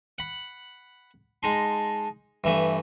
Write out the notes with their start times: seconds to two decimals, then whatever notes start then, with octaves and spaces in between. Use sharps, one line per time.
0.18 F#5 B5
1.43 G#3 D#4 A5 C6
2.44 G2 E3 A3 E5